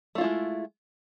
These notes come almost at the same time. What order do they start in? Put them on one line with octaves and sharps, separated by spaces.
A3 F4 E4 G#3